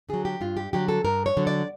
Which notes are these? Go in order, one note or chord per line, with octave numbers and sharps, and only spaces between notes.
D3 F#3 G#4
G4
G2 F4
G4
D3 F#3 G4
A4
G2 A#4
C#5
D3 F#3
D5